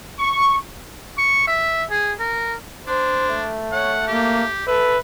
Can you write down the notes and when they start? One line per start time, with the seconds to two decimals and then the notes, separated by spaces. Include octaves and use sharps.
0.19 C#6
1.18 C#6
1.47 E5
1.90 G#4
2.19 A#4
2.87 D4 C5
3.30 A3
3.72 C#5 F#5
4.08 A#3 G4
4.67 A4 B4 E5